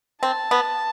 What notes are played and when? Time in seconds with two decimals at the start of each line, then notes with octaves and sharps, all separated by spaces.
0.23 C4 A5
0.51 B3